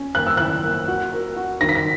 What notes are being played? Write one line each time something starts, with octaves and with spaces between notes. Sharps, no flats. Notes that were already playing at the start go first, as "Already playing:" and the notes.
Already playing: C#4
A#3 F#6
E6
E4 F#6
A#3
F#4
A#4
F#4
D#3 A#6
B6
A#6